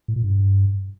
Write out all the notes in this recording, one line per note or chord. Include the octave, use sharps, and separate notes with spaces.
A2
A#2
G2